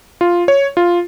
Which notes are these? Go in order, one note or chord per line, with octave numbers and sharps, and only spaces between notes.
F4
C#5
F4